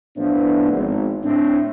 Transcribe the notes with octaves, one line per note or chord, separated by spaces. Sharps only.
A2 F3 B3 D4
G#1
A2 C4 D4